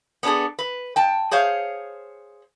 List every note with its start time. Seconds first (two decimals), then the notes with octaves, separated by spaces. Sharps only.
0.23 B3 C#4 D4 G#4 A4
0.59 B4
0.96 G5 A5
1.31 G#4 C5 C#5 F5